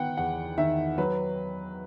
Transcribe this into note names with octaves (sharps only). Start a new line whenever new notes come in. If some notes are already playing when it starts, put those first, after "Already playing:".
Already playing: D#3 B3 F#5 G5
E2 F#5
D#3 E5
F#3 B4